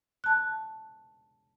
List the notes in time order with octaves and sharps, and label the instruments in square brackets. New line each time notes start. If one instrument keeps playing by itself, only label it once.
[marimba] A5 F#6